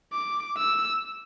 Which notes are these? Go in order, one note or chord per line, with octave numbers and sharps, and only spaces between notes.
D6
E6